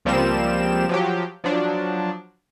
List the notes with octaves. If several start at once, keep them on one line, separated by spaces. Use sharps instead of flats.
C#2 F3 G3 A#3 C4 E7
F3 F#3 G4
F3 F#3 D4